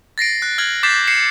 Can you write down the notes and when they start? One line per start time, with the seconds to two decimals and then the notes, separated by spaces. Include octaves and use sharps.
0.18 A6 A#6 C7 D7
0.42 F#6
0.58 F6 G#6 A6 F#7
0.83 D6 G6 A6 B6 C7 E7
1.07 C7 C#7 E7